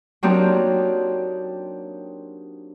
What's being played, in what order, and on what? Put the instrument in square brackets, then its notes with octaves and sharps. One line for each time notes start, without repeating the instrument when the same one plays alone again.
[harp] F#3 A#3 C4 D4 D#4 G4